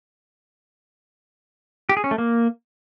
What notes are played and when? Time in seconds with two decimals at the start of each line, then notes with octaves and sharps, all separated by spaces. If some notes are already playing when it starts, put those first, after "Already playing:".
1.89 G4
1.97 G#4
2.04 C#4
2.11 A3
2.18 A#3